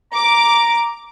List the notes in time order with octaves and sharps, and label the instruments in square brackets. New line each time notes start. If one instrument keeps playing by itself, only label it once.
[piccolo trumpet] A#5 [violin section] D6